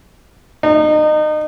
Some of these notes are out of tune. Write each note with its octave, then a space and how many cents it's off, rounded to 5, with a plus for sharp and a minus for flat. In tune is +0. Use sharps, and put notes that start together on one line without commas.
D#4 -30